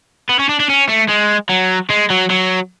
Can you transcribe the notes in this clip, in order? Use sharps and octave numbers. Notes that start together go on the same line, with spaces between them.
B3
C#4
D4
D4
C#4
A3
G#3
F#3
G#3
F#3
F#3